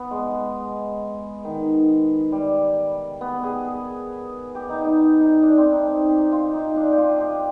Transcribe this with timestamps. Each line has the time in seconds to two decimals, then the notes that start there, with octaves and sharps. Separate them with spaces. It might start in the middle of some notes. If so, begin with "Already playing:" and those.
Already playing: B3
0.11 G#3
1.45 D#3
2.32 G3
3.21 B3
3.43 G#4
4.55 G4
4.69 D#4
4.84 D#4
5.21 D#4
5.42 D4
5.58 C4
5.72 D#4
5.88 D#4
6.09 G4
6.32 F4
6.53 D#4
6.76 D4
6.92 G4
6.98 F4
7.20 G4